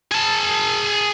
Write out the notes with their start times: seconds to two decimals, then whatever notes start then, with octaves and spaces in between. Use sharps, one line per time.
0.12 G#4 A5